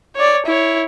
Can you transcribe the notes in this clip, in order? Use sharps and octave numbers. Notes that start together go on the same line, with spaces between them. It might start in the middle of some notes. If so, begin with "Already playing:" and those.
C#5 D5
E4 C#5